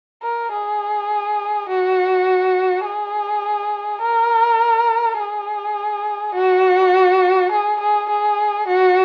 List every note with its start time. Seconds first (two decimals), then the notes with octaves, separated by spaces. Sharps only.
0.22 A#4
0.51 G#4
1.68 F#4
2.85 G#4
4.02 A#4
5.17 G#4
6.34 F#4
7.51 G#4
7.80 G#4
8.09 G#4
8.67 F#4